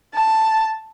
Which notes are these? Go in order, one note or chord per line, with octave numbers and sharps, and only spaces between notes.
A5